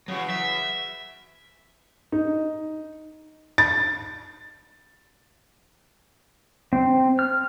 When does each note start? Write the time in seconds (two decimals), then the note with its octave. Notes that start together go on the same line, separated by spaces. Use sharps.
0.08 C#3 E3 F#3 F#4
0.30 E5
2.12 D#4
3.58 A6
6.73 C4
7.19 F6